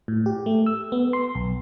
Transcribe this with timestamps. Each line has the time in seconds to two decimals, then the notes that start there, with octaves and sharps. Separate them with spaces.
0.08 A2
0.26 G4
0.46 A3
0.66 E6
0.92 B3
1.13 C6
1.35 B1